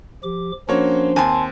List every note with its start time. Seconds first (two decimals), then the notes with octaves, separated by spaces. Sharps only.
0.23 F3 G4 D6
0.69 F3 A#3 C#4 D4 F#4 C5 C#5
1.16 D#2 C4 G#5 A5 C6